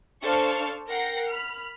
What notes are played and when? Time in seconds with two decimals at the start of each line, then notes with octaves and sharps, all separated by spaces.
0.22 D4 A4 C5 F5 C#6 F6
0.88 A#4 F#5 G5 A#6 C7
1.28 B5 F6